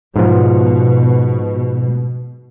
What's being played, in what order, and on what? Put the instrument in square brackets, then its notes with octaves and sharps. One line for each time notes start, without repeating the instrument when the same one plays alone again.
[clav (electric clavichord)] G#2 F3 [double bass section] B2